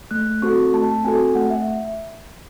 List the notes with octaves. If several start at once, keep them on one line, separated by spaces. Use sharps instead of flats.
A3 F#6
C4 F#4 A4 C#6
A3 A5
C4 F#4 A4 G#5
A3 F#5
E5